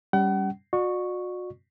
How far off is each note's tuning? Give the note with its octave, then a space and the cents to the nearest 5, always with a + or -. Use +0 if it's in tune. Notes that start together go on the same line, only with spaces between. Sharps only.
G3 +0 C#4 +20 F#5 +40
F#4 -35 D5 +40 C#6 +0